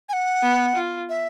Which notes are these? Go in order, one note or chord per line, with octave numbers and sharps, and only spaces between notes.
G#5
F#5
B3
F4
E5